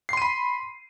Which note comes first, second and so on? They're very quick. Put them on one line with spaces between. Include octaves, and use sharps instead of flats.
C7 C6 D#7 B5